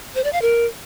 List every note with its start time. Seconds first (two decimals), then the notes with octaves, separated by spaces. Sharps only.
0.15 C5
0.24 D5
0.33 F5
0.42 A#4